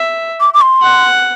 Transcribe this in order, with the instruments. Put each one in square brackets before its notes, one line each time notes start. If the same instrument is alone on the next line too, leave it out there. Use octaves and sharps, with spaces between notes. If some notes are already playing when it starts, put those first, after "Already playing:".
Already playing: [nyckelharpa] E5
[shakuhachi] D6
D6
C6
[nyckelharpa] F#5